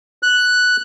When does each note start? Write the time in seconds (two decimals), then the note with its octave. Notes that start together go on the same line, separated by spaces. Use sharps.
0.23 F#6